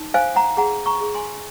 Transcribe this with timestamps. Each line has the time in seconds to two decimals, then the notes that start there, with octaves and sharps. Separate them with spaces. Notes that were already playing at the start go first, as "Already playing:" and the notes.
Already playing: D#4
0.14 C5 F5 G#5
0.36 F#5 A#5
0.57 G#4 F#5 A#5
0.86 A#5 C#6
1.01 G#4
1.14 G#5 C6